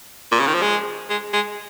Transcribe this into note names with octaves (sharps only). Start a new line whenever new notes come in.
A#2
C#3
D#3
F3
G#3
G#3
G#3